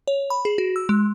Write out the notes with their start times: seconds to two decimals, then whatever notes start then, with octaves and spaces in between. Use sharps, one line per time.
0.08 C#5
0.30 B5
0.45 G#4
0.58 F#4
0.76 E6
0.89 G#3